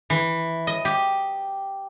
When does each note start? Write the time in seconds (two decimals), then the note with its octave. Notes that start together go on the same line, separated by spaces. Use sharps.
0.10 E3
0.67 D#5
0.85 G4